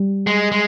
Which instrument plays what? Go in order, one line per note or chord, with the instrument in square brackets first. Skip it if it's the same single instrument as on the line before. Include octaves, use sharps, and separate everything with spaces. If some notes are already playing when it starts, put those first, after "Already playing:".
Already playing: [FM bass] G3
[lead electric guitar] G#3
G#3